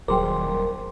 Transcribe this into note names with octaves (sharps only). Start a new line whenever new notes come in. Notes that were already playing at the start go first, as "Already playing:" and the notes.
D#1 F#3 G#4 A#4 C5 G5 C6 D6